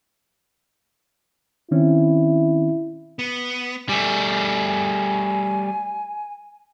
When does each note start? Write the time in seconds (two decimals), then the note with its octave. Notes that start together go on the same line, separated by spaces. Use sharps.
1.71 D#3 C4 C#4 E4
3.19 B3
3.89 G3 A3 G#5